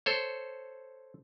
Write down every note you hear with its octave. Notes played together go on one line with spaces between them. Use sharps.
A4 C5 C#5